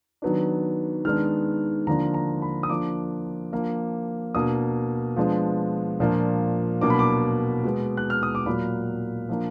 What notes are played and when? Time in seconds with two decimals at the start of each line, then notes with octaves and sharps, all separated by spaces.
0.22 D#3 F#3 B3 D4
1.05 D#3 G#3 B3 D4 F6
1.87 D3 F3 A#3 D4 A#5
2.14 A#5
2.42 B5
2.63 D#6
2.69 F3 A#3 D4 D6
3.52 F3 A#3 D4
4.34 B2 A#3 D4 D#6
5.17 F3 G#3 B3 D4
6.00 A#2 F3 A#3 D4
6.81 B2 F#3 A#3 D4 D6
6.90 B5
6.99 D6
7.64 B2 G#3 B3
7.97 F#6
8.10 F6
8.23 D#6
8.35 D6
8.46 A#2 F#3 A#3 B5
9.29 F3 A#3 D4